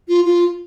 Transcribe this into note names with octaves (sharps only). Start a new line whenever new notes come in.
F4
F4